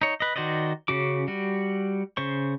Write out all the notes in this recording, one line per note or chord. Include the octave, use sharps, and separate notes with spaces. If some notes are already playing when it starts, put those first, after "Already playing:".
D#4 C#5
B4 D#5
D#3 F#4 C5 D5 D#5
C#3 C#4 F#4 D6
G3 F#4
C#3 C5 C#6